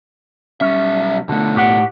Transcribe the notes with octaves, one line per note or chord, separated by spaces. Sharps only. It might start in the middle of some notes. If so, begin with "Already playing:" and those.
B1 G3 C#4 E5
B2 D3 A3
A2 G4 F#5